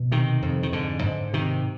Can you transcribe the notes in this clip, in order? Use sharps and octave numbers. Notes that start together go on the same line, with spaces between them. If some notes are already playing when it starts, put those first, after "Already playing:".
Already playing: B2
C3 D#3
F2
D#3
G#2 D3
G#2
C3 D#3